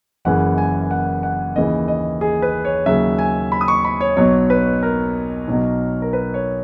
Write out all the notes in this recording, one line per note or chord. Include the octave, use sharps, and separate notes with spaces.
F#1 F#2 C#3 E3 F#5
G#5
F#5
F#5
D#2 C#3 E3 D#5
D#5
G#4
B4
C#5
D#2 C#3 F#3 E5
G#5
B5
D#6
C#6
B5
C#5
B1 B2 F#3 C#5
B4
A#4
B1 B2 F#3
A#4
B4
C#5